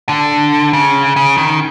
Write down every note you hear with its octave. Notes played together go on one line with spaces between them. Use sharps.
D3
C#3
C#3
D#3